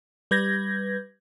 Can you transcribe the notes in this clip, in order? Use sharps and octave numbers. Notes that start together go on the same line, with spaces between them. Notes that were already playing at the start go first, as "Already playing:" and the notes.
G3 B4 G6 G#6 A#6